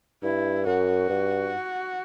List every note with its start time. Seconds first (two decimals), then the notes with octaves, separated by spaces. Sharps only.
0.23 G2 E4
0.66 F#2 F#4
1.09 G2